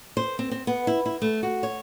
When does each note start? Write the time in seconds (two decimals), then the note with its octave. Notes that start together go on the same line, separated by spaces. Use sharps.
0.17 C5
0.39 C4
0.51 C4
0.67 B3
0.87 E4
1.06 E4
1.22 A3
1.43 F#4
1.63 C#5